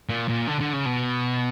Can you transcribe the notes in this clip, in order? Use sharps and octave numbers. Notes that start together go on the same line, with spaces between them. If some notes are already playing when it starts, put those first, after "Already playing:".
A#2
A#2
D3
D3
C#3
B2